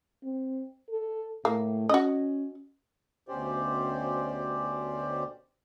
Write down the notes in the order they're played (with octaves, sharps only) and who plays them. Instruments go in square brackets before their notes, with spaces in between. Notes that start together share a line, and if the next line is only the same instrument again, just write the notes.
[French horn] C4
A4
[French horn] A2 [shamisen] A#3
[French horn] C#4 [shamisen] F#4 D#5
[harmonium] D2 B2 C#4 G4 C5 D5